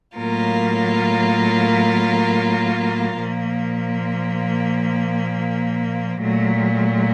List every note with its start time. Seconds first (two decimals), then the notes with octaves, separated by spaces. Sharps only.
0.17 A2 F#3 A#3 F4 A#4
3.18 A#2 F3 A#3
6.21 A#2 F#3 A3